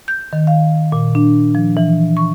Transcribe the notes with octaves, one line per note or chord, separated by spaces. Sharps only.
G6
D#3
F5
A#2
D4
F3
E3
C#6